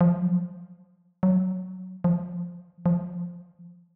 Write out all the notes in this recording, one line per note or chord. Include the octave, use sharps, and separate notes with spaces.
F3
F#3
F#3
F3
F3